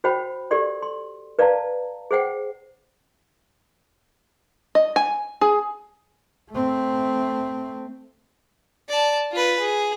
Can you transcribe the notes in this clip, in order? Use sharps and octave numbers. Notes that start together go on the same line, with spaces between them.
F#4 C5 C#5 G5 B5
G4 A4 D5 C6
C6
B4 D5 F5 A5 A#5
G#4 C5 F#5 G5
D#5
G#5
G#4
A3 C4
D5 A5
F4 B4
G#4